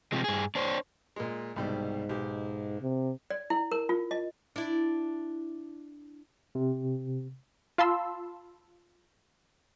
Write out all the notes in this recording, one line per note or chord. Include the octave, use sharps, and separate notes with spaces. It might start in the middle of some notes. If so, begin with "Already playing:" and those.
C3 F3 G#3
G2 G#4
D4 C5 C#5
A#2 G#3
C2 G#2 B2 G3
B1 G4
C3
D5
E4
A#4
F4
D#5
D4 E4
C3
F4 F5 A5 B5 C6 E6